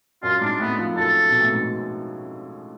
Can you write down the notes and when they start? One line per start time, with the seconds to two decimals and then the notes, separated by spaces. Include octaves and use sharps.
0.23 F#2 F4
0.41 G#2 D4
0.59 A2 B3
0.79 F3
0.97 F#2 A4
1.29 B2
1.41 A2
1.53 G#2